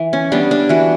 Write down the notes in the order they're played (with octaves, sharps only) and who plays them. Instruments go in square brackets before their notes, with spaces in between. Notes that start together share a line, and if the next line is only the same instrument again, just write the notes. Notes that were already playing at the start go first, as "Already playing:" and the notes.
Already playing: [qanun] E3
C#4
G3 B3 D4
D4
E3 F#4